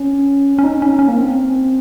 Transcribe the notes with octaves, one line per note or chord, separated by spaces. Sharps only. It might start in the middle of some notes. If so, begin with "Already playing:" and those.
Already playing: C#4
C#4
D#4
C#4
C#4
A#3
C4